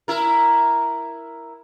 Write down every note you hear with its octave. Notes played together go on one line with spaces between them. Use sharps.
E4 A#4